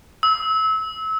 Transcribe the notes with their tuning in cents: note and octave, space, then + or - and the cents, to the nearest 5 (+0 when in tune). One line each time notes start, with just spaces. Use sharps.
E6 -30